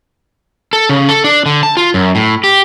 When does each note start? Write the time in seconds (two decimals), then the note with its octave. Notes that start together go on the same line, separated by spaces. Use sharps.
0.73 A4
0.89 C#3
1.09 A4
1.24 D4
1.46 D3
1.63 A5
1.77 F4
1.94 F#2
2.15 A2
2.44 G4